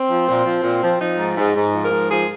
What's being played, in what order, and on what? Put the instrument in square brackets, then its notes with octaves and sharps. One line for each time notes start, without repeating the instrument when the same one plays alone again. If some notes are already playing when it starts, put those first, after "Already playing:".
Already playing: [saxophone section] C4
F3
A#2
F3
A#2
F3
F3 D#4
G#2
G#2
G#2
F3
A#4
G#2
F3 G#4